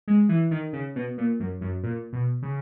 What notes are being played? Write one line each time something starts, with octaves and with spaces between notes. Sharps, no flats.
G#3
E3
D#3
C#3
B2
A#2
F#2
F#2
A#2
B2
C#3